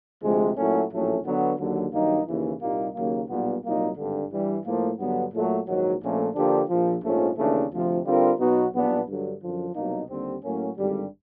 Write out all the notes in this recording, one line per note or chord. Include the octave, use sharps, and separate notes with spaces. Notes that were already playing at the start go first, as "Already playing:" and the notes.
D2 C3 F3 G#3
A#2 F#3 A3 C#4 E4
A#1 A2 F#3 A3 C#4
D3 F#3 B3
D#2 D3 F#3
G2 D#3 F#3 A#3 D#4
D#2 C#3 E3
C2 A#2 G3 A#3 D#4
D#2 C#3 F#3 A#3
B1 A#2 G3 B3
C2 A#2 F#3 A#3 D#4
G#1 G2 D3
G2 E3 G3
A2 F3 A#3
G2 D3 F#3 B3
A#2 F#3 A3
A#1 G#2 D#3 F#3
A#1 A#2 F3 A3 C#4
D3 F3 A#3 D4 G4
A#1 A#2 F3
A#1 G#2 F3 A3 C#4
D#2 C#3 E3 A3 D4
D2 C3 F3
D3 G3 C4 F4 A#4
B2 F#3 B3 D#4 F#4
B1 A#2 G3 B3 D4
G2 D3 F#3
F#2 D3 F3
C2 B2 F#3 A#3 D#4
D#2 D3 G3 C4
A2 F#3 A#3 C#4
G#1 G2 D3 G3